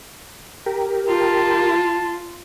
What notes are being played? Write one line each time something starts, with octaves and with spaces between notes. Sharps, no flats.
G4 A#4
F4 A5